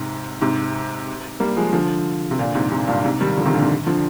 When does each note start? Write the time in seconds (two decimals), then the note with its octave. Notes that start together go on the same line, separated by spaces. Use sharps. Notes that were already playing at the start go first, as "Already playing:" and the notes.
Already playing: G#2 C3
0.41 G#2 C3
1.40 G3 A#3
1.57 F3 G#3
1.73 D3 F3
2.31 C3
2.39 A#2 D3
2.55 G#2 C3
2.71 G#2 C3
2.88 G2 A#2
3.05 G#2 C3
3.21 D#3 G3
3.37 D3 F3
3.46 C3 D#3
3.54 A#2 D3
3.62 G#2 C3
3.87 D3 F3